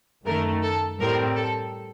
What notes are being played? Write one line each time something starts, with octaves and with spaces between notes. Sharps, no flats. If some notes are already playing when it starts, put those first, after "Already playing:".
F#2 D#3 A3 A#4
A4
A2 G3 C4 A#4
A4